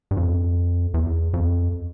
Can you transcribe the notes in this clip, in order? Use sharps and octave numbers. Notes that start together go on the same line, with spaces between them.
G2
F2
E2
F2